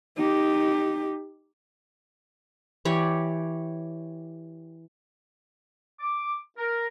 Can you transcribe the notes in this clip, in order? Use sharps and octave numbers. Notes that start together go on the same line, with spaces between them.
D#4 G4
E3 G4 C#5 D5
D6
A#4